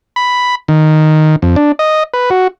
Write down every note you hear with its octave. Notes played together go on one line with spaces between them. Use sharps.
B5
D#3
F2
D4
D#5
B4
F#4